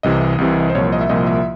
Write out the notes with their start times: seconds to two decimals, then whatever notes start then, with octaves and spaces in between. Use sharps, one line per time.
0.03 C2 C3 E3 D#5
0.38 C2 C3 E3
0.70 C5
0.75 C2 A#2 F3 C#5
0.92 D#5
1.01 E5
1.09 C2 A#2 F3 D#5
1.26 E5